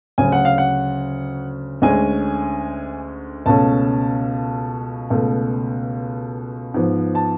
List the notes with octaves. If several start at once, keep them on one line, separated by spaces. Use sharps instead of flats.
D2 C#3 F#3 G#5
F#5
F5
F#5
D2 D3 G#3 C#4 G#5
C#2 B2 A3 C#4 A5
C#2 B2 A3
G#2 F3 B3
A5